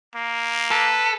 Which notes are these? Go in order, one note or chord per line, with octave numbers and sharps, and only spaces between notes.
A#3
A4 B4